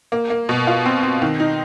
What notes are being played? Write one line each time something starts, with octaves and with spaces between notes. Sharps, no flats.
A#3
A#3
B2
F4
C4
C4
D#3
D#4